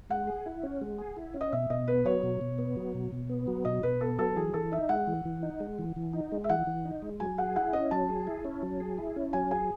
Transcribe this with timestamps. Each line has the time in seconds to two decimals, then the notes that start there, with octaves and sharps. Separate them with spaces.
0.10 G#3 F#5
0.27 G#4
0.46 E4
0.63 C#4
0.81 G#3
0.98 G#4
1.16 E4
1.34 C#4
1.41 D#5
1.52 B2 E5
1.70 B2 D#5
1.88 B3 B4
2.05 F#3 C#5
2.23 B2
2.41 B2
2.58 B3
2.76 F#3
2.94 B2
3.12 B2
3.29 B3
3.47 F#3
3.65 B2 D#5
3.83 B2 B4
4.01 B3 A4
4.18 F#3 A4
4.36 E3 G#4
4.53 E3 A4
4.72 D#4 E5
4.89 G#3 F#5
5.07 E3
5.25 E3
5.43 D#4
5.60 G#3
5.79 E3
5.96 E3
6.13 D#4
6.32 G#3
6.44 E5
6.49 E3 F#5
6.67 E3
6.85 D#4
7.02 G#3
7.20 F#3 G#5
7.38 G#4 F#5
7.56 E4 F#5
7.73 C#4 D#5
7.91 F#3 A5
8.09 G#4
8.27 E4
8.45 C#4
8.63 F#3
8.80 G#4
8.98 E4
9.16 C#4
9.33 F#3 G#5
9.51 G#4 G#5